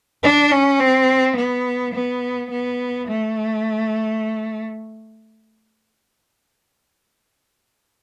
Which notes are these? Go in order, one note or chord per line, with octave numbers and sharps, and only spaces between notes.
D4
C#4
C4
B3
B3
B3
A3